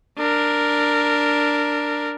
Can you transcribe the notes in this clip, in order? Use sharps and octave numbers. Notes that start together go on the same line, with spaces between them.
D4 A#4